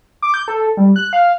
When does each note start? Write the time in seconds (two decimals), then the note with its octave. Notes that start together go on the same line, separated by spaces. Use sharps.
0.22 D6
0.34 G6
0.48 A4
0.77 G3
0.96 F#6
1.13 F5